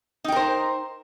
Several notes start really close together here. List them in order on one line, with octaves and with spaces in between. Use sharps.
D#4 G5 A#4 C5